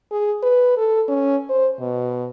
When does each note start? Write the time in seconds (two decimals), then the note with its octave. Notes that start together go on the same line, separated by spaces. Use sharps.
0.11 G#4
0.43 B4
0.77 A4
1.08 C#4
1.49 C5
1.80 B2